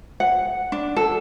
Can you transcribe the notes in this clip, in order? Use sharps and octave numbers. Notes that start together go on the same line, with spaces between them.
F#5
D4
A4